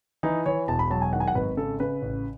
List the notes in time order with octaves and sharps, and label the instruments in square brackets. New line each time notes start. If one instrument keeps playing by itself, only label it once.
[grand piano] E3 D#4
E3 C#5
E1 A5
B5
F#3 A5
G#5
D#3 F#5
G#5
F#5
G#1 B4
C#3 A4
C#3 B4
A1